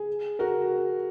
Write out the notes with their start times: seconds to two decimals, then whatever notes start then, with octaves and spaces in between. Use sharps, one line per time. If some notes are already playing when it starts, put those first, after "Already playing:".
Already playing: G#4
0.39 F#4 A#4